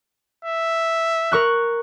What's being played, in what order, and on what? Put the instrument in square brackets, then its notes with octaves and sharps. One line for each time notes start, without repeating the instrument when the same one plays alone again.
[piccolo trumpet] E5
[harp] A#4 C#6 F#6